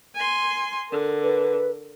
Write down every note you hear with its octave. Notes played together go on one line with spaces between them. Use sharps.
G#5 C6
D3 A#4
B4